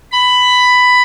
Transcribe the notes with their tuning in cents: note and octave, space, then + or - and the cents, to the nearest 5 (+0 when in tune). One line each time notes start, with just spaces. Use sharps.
B5 +10